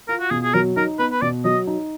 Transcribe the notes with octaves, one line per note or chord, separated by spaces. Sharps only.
F4 A#4
F#4
B2 G#4
G#4
F#3 A#4
D#4 A#4
B3 B4
B4
B2 D5
F#3 D#5
D#4